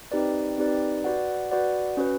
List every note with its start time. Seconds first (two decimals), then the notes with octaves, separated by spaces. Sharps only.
0.11 C4 D#4 G4 B4 D5
0.58 C4 D#4 G4 B4 D5
1.04 F#4 B4 D5 F#5
1.51 F#4 B4 D5 F#5
1.97 C#4 F#4 B4